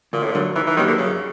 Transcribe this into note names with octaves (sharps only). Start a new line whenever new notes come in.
D2 A#2
A2
A#2
D3 F#3 A3
D#3 E3
E3
D#3 F#3 A#3 D4 G4
D3
F#2 C#3